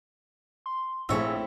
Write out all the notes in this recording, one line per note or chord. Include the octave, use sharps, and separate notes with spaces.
C6
A#1 A3 C4 E4 G#4 C#5 E6